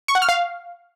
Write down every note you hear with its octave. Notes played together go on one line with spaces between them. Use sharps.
C#6
F#5
F6
F5